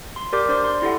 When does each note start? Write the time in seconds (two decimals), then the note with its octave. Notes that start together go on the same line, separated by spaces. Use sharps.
0.16 C6
0.33 G4 A#4 D5 D6 G6
0.49 D4 C5 D5 C6
0.64 C6
0.82 E4 G4 A4 F#5